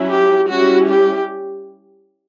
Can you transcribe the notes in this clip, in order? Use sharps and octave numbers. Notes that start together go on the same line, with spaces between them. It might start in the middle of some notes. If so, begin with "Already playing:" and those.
Already playing: F#3 C#4 E4
G4
G3 C#4 E4 F#4
G4